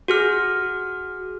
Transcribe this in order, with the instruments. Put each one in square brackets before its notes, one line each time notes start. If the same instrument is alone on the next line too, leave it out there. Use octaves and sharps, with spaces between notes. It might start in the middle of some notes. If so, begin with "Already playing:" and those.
[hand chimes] F#4 G#4 F6